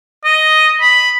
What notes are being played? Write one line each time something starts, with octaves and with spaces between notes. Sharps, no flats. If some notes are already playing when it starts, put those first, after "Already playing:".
D#5
B5